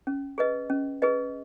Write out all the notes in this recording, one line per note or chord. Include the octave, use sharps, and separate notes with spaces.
C#4
G#4 B4 D#5
C#4
G#4 B4 D#5